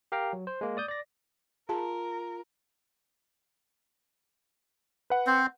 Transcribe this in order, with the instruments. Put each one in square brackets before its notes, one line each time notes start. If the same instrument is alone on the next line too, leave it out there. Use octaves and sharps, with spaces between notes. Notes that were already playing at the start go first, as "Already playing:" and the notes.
[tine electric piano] G4 A#4 F5 G5 A#5
F#3
C5
G#3 A#3
D5 D#6 G6
D5 A#6
[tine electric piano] F4 [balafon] G#4 A5 [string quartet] A#4
[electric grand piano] B4 F#5
[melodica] C4 C5